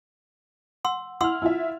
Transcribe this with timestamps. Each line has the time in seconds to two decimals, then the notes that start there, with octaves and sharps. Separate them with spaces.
0.85 F#5 C6 E6
1.21 E4 F#5 C6 E6 F6
1.42 E4 F4 E5